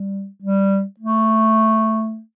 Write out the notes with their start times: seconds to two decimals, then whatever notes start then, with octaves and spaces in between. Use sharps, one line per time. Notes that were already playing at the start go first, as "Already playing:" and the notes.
Already playing: G3
0.42 G3
0.99 A3